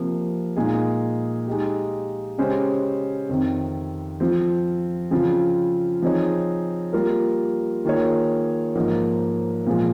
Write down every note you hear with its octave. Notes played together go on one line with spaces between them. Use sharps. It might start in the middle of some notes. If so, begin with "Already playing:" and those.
Already playing: C3 F3 A#3
A#2 G#3 D#4 G#4
G#3 D#4 G4
C#3 G#3 C#4 G4 C5
F2 C3 D#3
F3 C4 F4
C#3 F3 C4 F4
F3 C4 D#4 G#4 C#5
G3 A#3 F4 A#4
D#3 A#3 F4 G#4 C#5
G#2 F3 A#3
A#2 F3 G#3